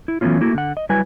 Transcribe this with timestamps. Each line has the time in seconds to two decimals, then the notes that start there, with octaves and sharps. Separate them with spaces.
0.08 E4
0.21 E3 F#3 A3 B3 C#4 F4
0.41 A3 A#3 E4 F#4
0.55 D3 F#5
0.77 D#5
0.89 F#3 G3 E4 B4 G#5